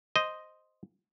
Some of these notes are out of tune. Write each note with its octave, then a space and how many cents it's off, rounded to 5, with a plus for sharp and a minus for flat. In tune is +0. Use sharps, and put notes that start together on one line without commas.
C5 +0 D#5 +0